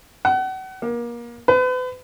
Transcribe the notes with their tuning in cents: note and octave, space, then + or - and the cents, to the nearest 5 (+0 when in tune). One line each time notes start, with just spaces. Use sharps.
F#5 +35
A#3 +30
B4 +40